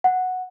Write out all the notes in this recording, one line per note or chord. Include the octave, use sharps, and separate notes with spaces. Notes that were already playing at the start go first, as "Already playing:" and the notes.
F#5